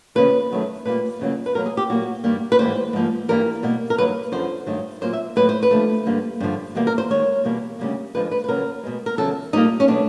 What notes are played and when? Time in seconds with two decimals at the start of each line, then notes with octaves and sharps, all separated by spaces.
0.15 D#2 C#3 F3 A#3 B4
0.50 F#2 D#3 F#3 A3
0.85 A#2 G3 A#3 B4
1.19 F2 C#3 F#3 A#3
1.46 B4
1.54 B2 F#3 A#3 A#4
1.66 G#4
1.77 G4
1.89 A#2 F#3 A#3 F#4
2.24 G2 D#3 G3 A#3
2.52 B4
2.59 G#2 E3 G3 A#3 C5
2.93 G#2 F3 A#3
3.28 G2 E3 G3 A#3 A#4
3.63 B2 G3 A#3
3.90 A#4
3.98 G2 D#3 F#3 A#3 B4
4.32 F#2 D3 F3 C5
4.66 G2 D#3 F#3 A3
5.01 A#2 F#3 A#3 C5
5.13 E5
5.36 A2 F#3 A#3 B4
5.49 C5
5.63 B4
5.71 D#2 D3 F3 A3
6.06 G2 D3 G3 A#3
6.40 G2 D3 F3
6.75 E2 B2 G3 A#3
6.87 A#4
6.98 C5
7.10 D#2 D#3 G#3 C#5
7.45 E2 B2 G3 A#3
7.79 D2 C#3 E3 G3 A#3
8.14 F2 D3 F3 G#3 B4
8.31 B4
8.44 B4
8.48 D#2 C#3 F#3 A#4
8.83 B2 G#3
9.06 A#4
9.17 E2 C#3 F#3 A4
9.53 A#2 G3 A#3 D#4
9.80 C#4
9.88 B2 F#3 A3 D4